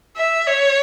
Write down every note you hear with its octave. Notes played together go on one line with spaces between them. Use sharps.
E5
C#5